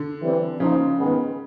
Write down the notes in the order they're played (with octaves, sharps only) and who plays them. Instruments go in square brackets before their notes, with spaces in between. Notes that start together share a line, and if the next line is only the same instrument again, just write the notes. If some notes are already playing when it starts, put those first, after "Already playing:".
Already playing: [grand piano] D3
[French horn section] E3 G3 C4
[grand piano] C#3 [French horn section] F3 A#3 D#4
[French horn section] G#2 D#3 G#3 B3